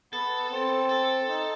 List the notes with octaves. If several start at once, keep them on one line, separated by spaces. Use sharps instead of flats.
B3 A4
C4
A4
D#4